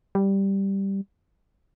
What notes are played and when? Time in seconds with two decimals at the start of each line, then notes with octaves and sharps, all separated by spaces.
0.15 G3